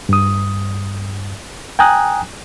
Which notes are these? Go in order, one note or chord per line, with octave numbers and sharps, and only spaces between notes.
G2 D#6
G5 G#5 A#5 D#6 F#6